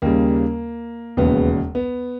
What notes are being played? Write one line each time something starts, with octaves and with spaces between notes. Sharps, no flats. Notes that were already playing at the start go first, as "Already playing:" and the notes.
D#2 C#3 G3 A#3
E1 D#2 C#3 B3
B3